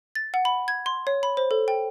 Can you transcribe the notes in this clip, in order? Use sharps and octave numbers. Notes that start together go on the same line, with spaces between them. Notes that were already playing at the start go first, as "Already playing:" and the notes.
A6
F#5
B5
G#6
C6
C#5
B5
C5
A4
G5